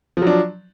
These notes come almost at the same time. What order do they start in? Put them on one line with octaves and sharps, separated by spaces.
F3 F#3 D4